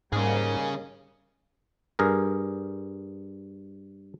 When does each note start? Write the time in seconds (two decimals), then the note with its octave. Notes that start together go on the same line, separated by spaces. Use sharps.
0.13 G#2 G3 A#3 C#4 G#4 D#5
1.99 G2 G#4 A#4